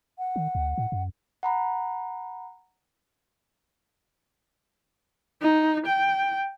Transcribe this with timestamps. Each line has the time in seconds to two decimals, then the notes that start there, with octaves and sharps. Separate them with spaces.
0.18 F#5
0.36 D#3
0.55 D2
0.78 A2
0.92 F#2
1.43 F#5 A#5 B5
5.42 D#4
5.87 G5